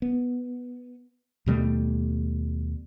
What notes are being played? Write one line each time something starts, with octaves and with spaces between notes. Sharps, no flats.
B3
D#2 B2 G3 A3